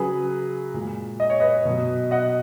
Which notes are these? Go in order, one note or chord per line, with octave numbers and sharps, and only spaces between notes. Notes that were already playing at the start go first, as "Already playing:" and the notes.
Already playing: C#3 F#3 G#4 B4
A#2 G#3
D#5
C#5
B4 D#5
B2 F#3
D#5 F#5